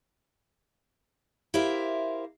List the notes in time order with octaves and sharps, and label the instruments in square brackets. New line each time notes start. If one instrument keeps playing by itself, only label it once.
[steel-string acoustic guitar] E4 G4 A#4 C5 E5 F5